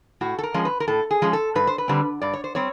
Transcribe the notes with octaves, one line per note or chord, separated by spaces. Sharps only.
A2 F#4
A4
A#4
F3 G#3 C#4
B4
A#4
A2 A4
G#4
F3 G#3 C#4
A4
G2 B4
C5
B4
D3 G3 C4
G2 D5
C#5
C5
G3 C4 C#5